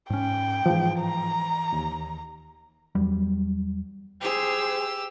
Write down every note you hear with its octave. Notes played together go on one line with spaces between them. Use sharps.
G#2 C#4 G5
G#2 E3 F3
A#5
D#2
E2 F#3 G3
G4 G#4 C5 E6